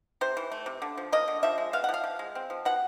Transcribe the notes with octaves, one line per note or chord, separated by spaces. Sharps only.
C3 C5
E3
A3
C3
D3
F3
A#3 D#5
D3
F3 E5
G#3
B3 F5
F#5
F3
F5
F3
G#3
C4
F3
B2 F#5